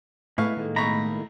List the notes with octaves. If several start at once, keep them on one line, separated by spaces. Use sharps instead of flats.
A2 G#3 A3 B3 E4 F5 C#6
D#3 G#3 A#3
B1 A#5 B5 C#6